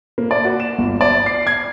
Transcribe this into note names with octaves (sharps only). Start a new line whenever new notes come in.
A#3
D5
F#4
E7
G1
D5
C7
G#6